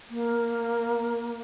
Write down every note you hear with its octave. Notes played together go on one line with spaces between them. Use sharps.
A#3